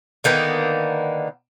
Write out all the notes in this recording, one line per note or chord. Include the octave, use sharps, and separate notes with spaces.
D3 D#3 A#3 B3